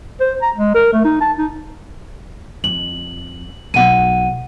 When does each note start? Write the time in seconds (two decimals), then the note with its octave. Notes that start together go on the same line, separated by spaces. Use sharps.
0.20 C5
0.42 A#5
0.56 G#3
0.75 A#4
0.93 A3
1.05 D#4
1.21 A5
1.38 D#4
2.64 F2 F#7
3.74 B1 B3 F#5 D#7